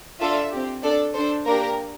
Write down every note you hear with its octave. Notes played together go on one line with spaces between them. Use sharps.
D4 F4 A4 E5
C4 G4
D4 A4 D5
D4 A4 C5
A#3 D4 G4 A#4